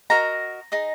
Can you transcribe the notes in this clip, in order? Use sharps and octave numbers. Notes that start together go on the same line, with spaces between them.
F#4 A#4 D#5 A#5
D#4 G#4 D#5